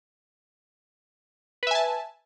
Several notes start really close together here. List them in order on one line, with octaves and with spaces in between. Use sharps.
B4 E5 G#5 A5